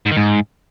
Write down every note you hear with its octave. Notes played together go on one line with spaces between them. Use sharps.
G#2
D#3
G#2